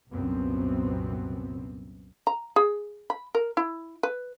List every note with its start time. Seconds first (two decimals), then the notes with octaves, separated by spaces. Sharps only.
0.11 C2 F#2 A#2 B3 C4
2.27 A#5
2.56 G#4
3.10 B5
3.35 A#4
3.57 E4
4.03 B4